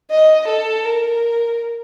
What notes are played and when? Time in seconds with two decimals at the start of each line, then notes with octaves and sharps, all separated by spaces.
0.11 D#5
0.48 A4
0.84 A#4